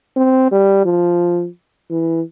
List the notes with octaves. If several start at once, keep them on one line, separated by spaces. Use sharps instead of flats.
C4
G3
F3
E3